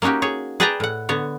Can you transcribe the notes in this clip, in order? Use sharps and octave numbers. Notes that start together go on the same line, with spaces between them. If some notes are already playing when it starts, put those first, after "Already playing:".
A#3 C#4 D#4 F#4 G4
G#4 C#5
G#4 B4 D5 G5 A5 A#5
A2 F#5
D3 B3 C#5